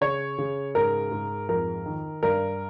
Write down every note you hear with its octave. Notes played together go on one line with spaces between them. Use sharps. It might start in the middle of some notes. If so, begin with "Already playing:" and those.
C#3 C#5
C#3
G#2 A#4
G#2
F2 A#4
D#3
G2 A#4